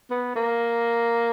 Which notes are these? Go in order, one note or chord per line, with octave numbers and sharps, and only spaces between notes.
B3
A#3